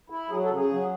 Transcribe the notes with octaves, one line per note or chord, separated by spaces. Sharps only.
E4
F#3 G#4
A4
C#3
G#4
F#3